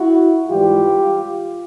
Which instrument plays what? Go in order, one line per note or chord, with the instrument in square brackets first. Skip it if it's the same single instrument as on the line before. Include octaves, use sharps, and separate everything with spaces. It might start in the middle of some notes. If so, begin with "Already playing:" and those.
Already playing: [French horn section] E4 F#4
G#2 E3 G3 F4 G4